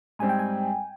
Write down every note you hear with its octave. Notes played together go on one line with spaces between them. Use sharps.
G#2 G3 C4 G#5
G5
G#5